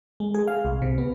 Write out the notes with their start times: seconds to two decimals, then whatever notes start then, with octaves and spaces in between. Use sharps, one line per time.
0.20 G#3
0.34 G#4
0.47 F5
0.65 C2
0.82 C3
0.98 B3